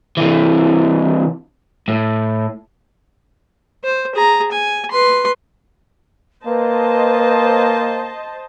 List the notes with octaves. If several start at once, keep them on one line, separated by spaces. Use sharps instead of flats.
C3 E3
A2
C5
G#4 A#5
G#5
B4 C6
A#3 B4 C5 D#5 A5